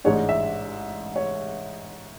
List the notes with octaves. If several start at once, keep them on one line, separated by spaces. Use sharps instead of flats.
A1 G#2 G#3 D4 C#5
E5
C#5